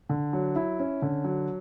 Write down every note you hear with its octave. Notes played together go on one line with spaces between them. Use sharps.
D3
F#3
E4
C#4
D3
F#3